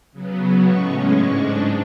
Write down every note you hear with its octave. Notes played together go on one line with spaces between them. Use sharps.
C#3 F#3 B3
A2 G#3 C#4 C#6
G#2 G#3 D4 C#6